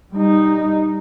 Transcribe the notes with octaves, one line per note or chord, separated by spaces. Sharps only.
G3 D#4